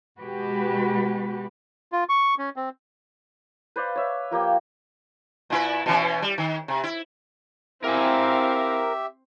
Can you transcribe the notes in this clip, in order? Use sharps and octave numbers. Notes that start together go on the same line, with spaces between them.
B2 G#3 F#4 G4 B4
F4
C#6
C#4
C4
B4 C5 D5 F5
C#5 E5
F3 A#3 G4 G5
A#2 E4 B4
B2 E3 C#4
G3
D#3
C3
E4
C4 E4 G4 A#4 E5 F5 G#5